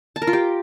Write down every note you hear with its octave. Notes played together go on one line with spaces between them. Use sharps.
A5
A#4
F4
G4